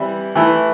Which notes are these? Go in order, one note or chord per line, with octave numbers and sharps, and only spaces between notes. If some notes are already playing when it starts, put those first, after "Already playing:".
Already playing: E3 G3 C4 E4
E3 A3 E4